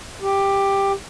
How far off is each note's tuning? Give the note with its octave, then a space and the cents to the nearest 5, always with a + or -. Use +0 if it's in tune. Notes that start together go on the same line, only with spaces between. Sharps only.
G4 +10